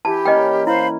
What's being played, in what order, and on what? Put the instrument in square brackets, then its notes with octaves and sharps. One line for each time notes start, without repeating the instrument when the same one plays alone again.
[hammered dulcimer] E3 [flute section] G4 [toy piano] A5
[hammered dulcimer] E3 A#3 C#4 [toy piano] D#5 G5
[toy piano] E4 [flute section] C5 F5 B5